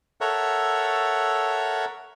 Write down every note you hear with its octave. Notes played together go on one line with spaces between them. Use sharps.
A4 A#4 C#5 E5 F#5